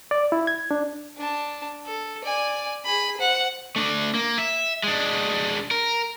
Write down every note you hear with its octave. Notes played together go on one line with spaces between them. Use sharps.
D5
E4
G#6
D4
D4 A5
A4
D5 G#5
G#4 B5
C5 F#5
A3 D4
A#3
E5
G#3 D4
A#4